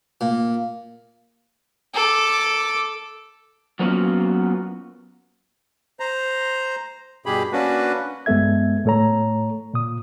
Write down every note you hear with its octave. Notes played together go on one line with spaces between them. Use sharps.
A#2
A4 D6
F#3 A#3 B3 C#4 F4 F#4
C5 A#5
G2 B2 G4 G#4 B5
A#3 C#4 D4 F#4 B4
G2 G#3 B3 A4 E5 G#6
A2 A3 A4 C#5 A#5
A#2 D#6